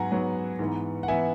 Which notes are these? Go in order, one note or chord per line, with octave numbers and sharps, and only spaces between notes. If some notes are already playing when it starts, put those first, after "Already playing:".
Already playing: G#2 F#3 B3 F#5 G#5 A#5
G#2 F#3 B3
G#2 E3 B3
F#5
E3 B3 E5 G#5